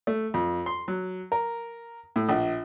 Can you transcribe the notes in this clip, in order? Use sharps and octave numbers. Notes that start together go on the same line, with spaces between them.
A3
F2
C6
F#3
A#4
A2
A#1